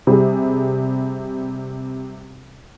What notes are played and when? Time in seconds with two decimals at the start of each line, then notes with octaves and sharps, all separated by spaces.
0.07 C3 G3 G#4